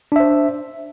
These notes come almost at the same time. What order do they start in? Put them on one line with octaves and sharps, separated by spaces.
D4 E5 C5